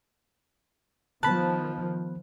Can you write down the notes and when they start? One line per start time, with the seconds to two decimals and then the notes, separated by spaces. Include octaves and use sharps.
1.23 D#3 F3 B3 A5 B5 F#6